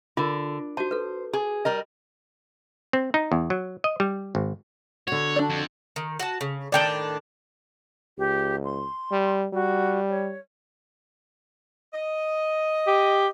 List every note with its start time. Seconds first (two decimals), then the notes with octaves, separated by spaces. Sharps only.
0.17 D3 F4 A#4
0.77 F#4 C5 A5
0.91 A4 B4
1.33 G#4
1.65 G3 A#4 D#5
2.93 C4
3.14 D#4
3.32 E2
3.50 F#3
3.84 D#5
4.00 G3
4.35 G#1
5.07 D3 F#4 C#5
5.36 D4 D5
5.50 F2
5.96 D#3
6.19 F#4 A5
6.41 C#3
6.72 A2 D#3 D4 D5 G5 A5
8.18 C#2 G4
8.65 C6
9.11 G3
9.53 G3 F#4
10.09 C#5
11.92 D#5
12.87 G4